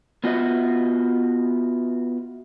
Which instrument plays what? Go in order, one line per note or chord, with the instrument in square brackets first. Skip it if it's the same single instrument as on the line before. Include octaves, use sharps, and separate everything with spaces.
[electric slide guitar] B3 F4 F#4 D#5 E5